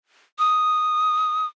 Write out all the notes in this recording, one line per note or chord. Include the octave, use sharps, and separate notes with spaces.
D#6